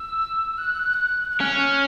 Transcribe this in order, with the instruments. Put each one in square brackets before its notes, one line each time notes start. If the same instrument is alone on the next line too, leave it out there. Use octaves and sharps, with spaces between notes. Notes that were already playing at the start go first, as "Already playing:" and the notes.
Already playing: [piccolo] E6
F#6
F#6
[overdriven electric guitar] C#4 [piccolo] F6